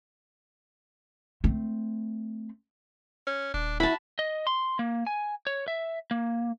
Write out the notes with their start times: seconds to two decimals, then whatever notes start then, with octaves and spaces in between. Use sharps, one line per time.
1.44 A3 C4
3.27 C#4
3.54 D#1 D4
3.80 E4 F#4 A5 B5
4.19 D#5
4.47 C6
4.79 A#3
5.07 G#5
5.47 C#5
5.68 E5
6.11 A#3